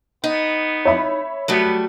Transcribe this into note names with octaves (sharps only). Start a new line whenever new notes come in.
B3 D#4
C#5 E5 B5
F#3 G3 A3 B3